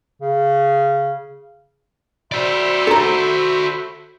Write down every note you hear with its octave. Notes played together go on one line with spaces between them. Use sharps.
C#3
F#4 C5 D5 E5 B5
A4 A#5